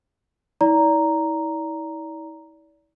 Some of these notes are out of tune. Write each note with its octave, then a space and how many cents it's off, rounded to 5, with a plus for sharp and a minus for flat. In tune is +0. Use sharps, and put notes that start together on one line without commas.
E4 -40 D5 -30 A#5 +0